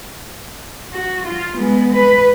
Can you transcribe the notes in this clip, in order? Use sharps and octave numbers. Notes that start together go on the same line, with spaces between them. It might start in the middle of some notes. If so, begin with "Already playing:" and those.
F#4
F4
G#3 B3
B4